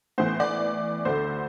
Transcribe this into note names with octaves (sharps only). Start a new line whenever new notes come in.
A2 E3 B3 C5
D5
D2 D3 A3 C5